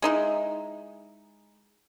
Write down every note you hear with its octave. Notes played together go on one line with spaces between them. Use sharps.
G#3 D#4 E4